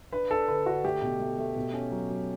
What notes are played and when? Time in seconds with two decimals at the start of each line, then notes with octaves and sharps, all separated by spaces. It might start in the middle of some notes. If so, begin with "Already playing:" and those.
0.12 D4 B4
0.31 D4 A4
0.48 D3 B4
0.66 D3 F#4
0.84 A3 G4
1.02 B2
1.20 A3
1.39 A3
1.56 B2
1.73 C#4
1.91 F#3
2.10 F#3